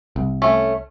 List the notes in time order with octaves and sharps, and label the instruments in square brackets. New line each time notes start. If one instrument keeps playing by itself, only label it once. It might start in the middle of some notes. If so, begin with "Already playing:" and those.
[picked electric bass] C2
[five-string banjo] A3 C#4